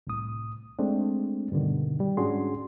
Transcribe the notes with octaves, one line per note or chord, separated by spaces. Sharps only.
C2 A2 D#6
G#3 A3 C4 D4
G2 B2 D3 D#3
G3
G#2 C#4 D4 F#4 G#4 C6